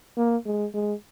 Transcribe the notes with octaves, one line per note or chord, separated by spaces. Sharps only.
A#3
G#3
G#3